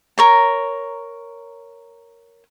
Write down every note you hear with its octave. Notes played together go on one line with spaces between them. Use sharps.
A#4 C#5 A#5